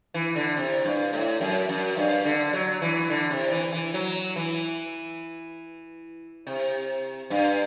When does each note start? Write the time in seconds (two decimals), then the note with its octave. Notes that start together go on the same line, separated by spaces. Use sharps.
0.14 E3
0.36 D3
0.56 C3
0.85 G2
1.13 A2
1.41 F#2
1.69 F#2
1.97 G2
2.25 D3
2.53 F#3
2.82 E3
3.10 D3
3.31 C3
3.51 E3
3.73 E3
3.94 F#3
4.36 E3
6.47 C3
7.30 G2